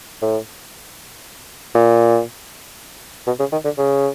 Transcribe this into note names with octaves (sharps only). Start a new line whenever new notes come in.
A2
A#2
B2
C#3
D#3
D3
C#3